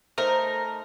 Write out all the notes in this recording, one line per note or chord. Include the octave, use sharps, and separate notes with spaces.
A3 D#4 A#4 C5